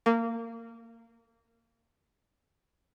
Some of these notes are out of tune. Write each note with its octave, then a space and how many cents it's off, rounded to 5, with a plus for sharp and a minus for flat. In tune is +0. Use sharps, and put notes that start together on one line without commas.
A#3 -20